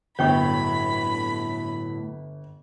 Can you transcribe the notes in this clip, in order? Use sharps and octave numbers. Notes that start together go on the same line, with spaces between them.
G1 A2 F#3 C#5 G5 B5 C#6